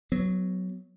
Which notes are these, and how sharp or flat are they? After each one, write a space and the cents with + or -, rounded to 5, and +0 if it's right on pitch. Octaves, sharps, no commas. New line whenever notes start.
F#3 +0 B3 +25